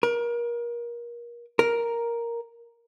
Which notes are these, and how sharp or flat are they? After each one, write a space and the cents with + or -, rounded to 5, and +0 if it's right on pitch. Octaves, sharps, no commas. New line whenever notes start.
A#4 +30
A#4 +5